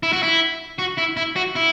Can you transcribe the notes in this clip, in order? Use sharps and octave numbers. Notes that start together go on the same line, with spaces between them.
E4
F#4
E4
F#4
E4
E4
F#4
E4